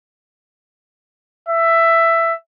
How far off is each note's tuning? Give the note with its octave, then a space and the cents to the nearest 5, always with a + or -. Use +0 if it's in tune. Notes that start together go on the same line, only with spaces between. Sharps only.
E5 +10